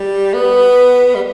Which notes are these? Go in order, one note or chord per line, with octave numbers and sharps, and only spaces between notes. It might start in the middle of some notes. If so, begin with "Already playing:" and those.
Already playing: G3
B3
G3